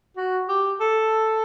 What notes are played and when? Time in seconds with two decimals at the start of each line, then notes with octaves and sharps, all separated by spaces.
0.17 F#4
0.49 G4
0.81 A4